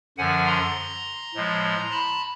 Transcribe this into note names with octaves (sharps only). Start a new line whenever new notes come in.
F#2 D3 F3 F#5 G#5
A#5 C6
A2 F3 G#3
A5 B5